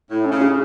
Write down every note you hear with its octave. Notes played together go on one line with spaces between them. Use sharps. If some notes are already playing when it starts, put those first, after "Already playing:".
A2 E4
C#4
C#3
G#4